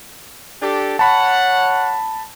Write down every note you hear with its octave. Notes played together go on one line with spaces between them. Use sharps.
D4 G4 A4
C#5 F#5 A5 B5